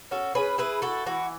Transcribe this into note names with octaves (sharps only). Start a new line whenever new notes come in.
C#4 F#4 A4
C#4 G#4 B4
E4 G#4 B4
E4 F#4 A4
E3 F#4